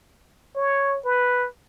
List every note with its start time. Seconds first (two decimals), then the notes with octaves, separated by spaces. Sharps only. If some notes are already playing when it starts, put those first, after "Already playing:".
0.56 C#5
1.04 B4